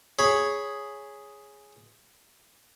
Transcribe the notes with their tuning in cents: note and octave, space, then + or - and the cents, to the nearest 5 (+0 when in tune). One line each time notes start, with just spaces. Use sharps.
G#4 +0 C#5 +0 B5 +0